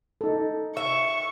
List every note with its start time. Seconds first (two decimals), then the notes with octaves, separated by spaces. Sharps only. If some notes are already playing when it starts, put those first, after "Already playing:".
0.21 D#4 A4
0.77 E5 C#6